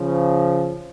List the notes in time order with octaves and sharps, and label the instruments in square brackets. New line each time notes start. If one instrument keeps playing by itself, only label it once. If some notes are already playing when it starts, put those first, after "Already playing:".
Already playing: [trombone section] C#3 F3